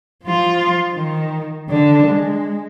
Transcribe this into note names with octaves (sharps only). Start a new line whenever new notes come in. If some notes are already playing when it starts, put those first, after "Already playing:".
F3 F4
D#3
D3 D4
G#3